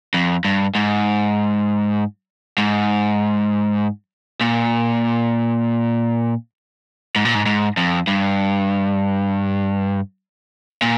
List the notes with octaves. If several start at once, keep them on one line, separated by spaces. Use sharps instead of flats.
F2
G2
G#2
G#2
A#2
G#2
A#2
G#2
G#2
F2
G2
A#2